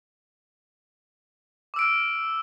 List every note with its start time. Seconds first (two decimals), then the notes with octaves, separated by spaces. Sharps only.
1.74 D6
1.76 E6
1.79 D7
1.81 F6